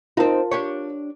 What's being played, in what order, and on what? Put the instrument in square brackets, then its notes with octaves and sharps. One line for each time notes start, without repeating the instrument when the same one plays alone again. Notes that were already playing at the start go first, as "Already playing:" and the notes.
[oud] C4 D#4 [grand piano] F4 A#4 A5
[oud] D4 G4 C#5